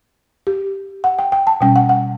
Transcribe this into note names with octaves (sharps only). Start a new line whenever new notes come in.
G4
F#5
G5
G5
A5
B2 G3 C#4 G5
F#5
F#5